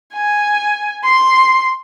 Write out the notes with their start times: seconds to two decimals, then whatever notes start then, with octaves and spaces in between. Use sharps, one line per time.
0.14 G#5
1.04 C6